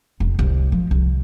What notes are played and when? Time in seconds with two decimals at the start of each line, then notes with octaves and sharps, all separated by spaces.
0.20 F1
0.39 C2
0.72 F3
0.91 C2